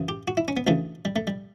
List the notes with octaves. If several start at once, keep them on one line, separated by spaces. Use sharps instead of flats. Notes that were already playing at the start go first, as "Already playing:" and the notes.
Already playing: F#2 C#3 E3
G4
F#4
E4
C#4
B3
D2 C#3 E3 A3
G3
A3
G3